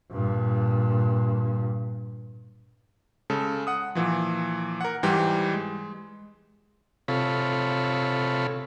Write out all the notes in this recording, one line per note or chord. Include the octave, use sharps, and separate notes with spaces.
G2 A#2
C#3 G#3 A4
F#5 D#6
A#2 E3 F3
A#4 F#5
G#2 E3 G3 G4
G#3
C3 F4 A4 C#5 B5